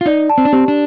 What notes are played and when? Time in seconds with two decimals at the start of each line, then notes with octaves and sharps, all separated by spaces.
0.01 F4
0.06 D#4 D5
0.29 A5
0.38 C4
0.45 D4
0.52 C4 G4
0.68 D4